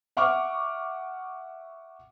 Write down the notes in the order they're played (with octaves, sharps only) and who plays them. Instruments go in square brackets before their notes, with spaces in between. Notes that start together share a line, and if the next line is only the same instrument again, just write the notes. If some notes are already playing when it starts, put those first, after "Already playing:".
[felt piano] E5 F#5 C#6 D6 F6